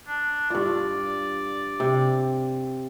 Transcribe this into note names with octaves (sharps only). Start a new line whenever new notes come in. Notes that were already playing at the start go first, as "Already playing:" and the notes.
D4
G2 F4 D5
C3